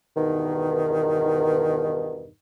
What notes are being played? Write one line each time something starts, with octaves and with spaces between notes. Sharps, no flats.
E2 G2 B2 D#3